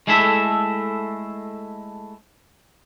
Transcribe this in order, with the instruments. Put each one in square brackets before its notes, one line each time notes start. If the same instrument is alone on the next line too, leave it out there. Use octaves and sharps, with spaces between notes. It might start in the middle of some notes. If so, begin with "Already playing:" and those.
[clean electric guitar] G#3 A3 E4 A4 E5